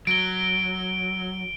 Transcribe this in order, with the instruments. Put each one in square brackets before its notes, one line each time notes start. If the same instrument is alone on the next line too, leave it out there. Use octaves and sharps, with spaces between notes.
[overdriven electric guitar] F#3 [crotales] D7 G7